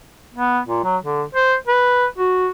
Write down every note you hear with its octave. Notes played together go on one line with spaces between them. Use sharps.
B3
A#2
F#3
D3
C5
B4
F#4